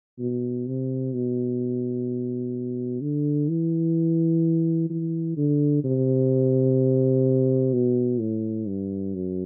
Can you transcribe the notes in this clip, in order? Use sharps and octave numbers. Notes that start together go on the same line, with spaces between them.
B2
C3
B2
D3
E3
E3
D3
C3
B2
A2
G2
F#2